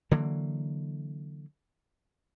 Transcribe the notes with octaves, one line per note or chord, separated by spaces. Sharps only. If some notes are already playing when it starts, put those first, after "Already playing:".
D3 E3 F#3 A#3